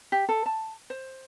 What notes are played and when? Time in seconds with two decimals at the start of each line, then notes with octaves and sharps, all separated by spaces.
0.12 G4
0.29 A4
0.46 A5
0.90 C5